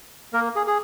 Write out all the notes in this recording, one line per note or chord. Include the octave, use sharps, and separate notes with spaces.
A#3 A#4
G#4
G#4